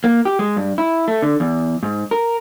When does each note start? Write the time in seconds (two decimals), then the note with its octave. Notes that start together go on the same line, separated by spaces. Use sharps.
0.04 A#3
0.25 G4
0.39 G#3
0.56 G2
0.78 E4
1.08 A3
1.22 D3
1.40 E2
1.83 G#2
2.11 A#4